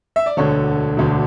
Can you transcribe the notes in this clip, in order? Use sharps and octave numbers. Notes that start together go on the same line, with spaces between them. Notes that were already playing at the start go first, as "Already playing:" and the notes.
E5
D5
E1 D2 D3 A4 C#5
E1 D2 D3